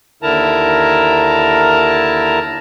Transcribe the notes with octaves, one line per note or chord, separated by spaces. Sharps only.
D#2 D3 E4 A#4 A5 A#5